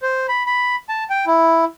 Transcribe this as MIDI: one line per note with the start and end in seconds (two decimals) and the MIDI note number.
0.02 0.26 72
0.28 0.43 83
0.46 0.76 83
0.89 1.04 81
1.10 1.25 79
1.27 1.65 64